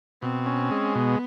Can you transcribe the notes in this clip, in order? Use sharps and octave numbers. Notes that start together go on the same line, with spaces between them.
B2 C4
C#4
G#3
B2 B3